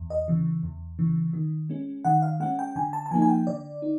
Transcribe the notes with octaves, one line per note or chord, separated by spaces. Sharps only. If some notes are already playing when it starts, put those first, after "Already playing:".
Already playing: E2
D#5
C#3 E3
E2
C#3 E3
D#3
G#3 C#4
D#3 F#5
F5
G#3 C#4 F#5
G5
D3 G#5
A5
A5
F3 A#3 D#4 G#5
G#5
G5
D3 D5
D#4